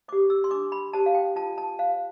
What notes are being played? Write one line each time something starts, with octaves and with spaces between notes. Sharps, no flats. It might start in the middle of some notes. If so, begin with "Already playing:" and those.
G4 C5 D6
E6
C6
D4 D6
B5
G4 C5 A5
F5
G5
F4 A5
A5
C5 F5